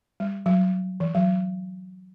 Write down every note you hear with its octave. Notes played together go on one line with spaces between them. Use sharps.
G3
F#3
E3
F#3